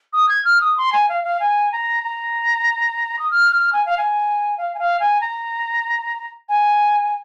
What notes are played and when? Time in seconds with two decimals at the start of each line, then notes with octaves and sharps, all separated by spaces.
0.13 D#6
0.29 G#6
0.45 F6
0.61 D#6
0.77 C6
0.92 G#5
1.09 F5
1.24 F5
1.40 G#5
1.72 A#5
2.04 A#5
3.19 D#6
3.31 F6
3.52 F6
3.73 G#5
3.86 F5
3.98 G#5
4.57 F5
4.74 G#5
4.79 F5
5.00 G#5
5.21 A#5
6.49 G#5